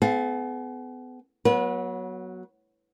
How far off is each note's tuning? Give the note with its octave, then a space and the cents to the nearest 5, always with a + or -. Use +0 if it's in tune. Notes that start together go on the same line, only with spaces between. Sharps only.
B3 +35 G#4 +45 F5 +0
F#3 +0 B3 -30 B4 -30